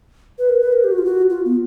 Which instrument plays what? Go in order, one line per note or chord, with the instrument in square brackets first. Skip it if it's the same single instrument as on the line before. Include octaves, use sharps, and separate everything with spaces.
[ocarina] B4
A#4
B4
A#4
G4
F#4
F4
F#4
F4
B3